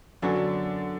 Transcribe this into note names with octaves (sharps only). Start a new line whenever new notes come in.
F#2 D3 F#3 B3 D4 F#4